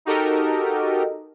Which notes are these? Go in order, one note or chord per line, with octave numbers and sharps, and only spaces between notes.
D#4 F#4 G4 A4 A#4 D#5